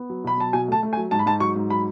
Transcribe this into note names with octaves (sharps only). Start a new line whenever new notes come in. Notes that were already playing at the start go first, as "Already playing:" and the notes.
Already playing: B3
F#3
B2 B5
F#3 A5
B2 G#5
A3 A5
A3
G#5
F#3
G#2 A5
B5
G#2 A5
F#3 C#6
G#2
F#3 B5